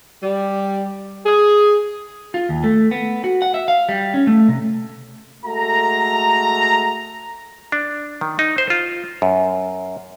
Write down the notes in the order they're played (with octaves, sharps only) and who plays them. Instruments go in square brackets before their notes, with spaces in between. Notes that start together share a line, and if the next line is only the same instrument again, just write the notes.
[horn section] G3
G#4
[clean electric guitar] F4
D#2
A3
B3
F#4
F#5
E5
F5
G3
C#4
A3
C3
[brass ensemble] G#3 A3 F#4 A4 A#5
[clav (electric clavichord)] D4
D#3
D#4
C5
F4
F#2